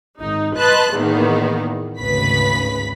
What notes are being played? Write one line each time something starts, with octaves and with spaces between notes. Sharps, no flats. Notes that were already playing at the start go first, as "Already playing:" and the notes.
G#1 D#4
B4 D#5 A5 C6 F#6
E2 A2 D#3 A#3 B3
G#1 D2 C#3 B4 B5 B6